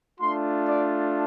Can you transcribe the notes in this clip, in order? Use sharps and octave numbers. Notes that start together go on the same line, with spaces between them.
A3 D4 F4 C6
D5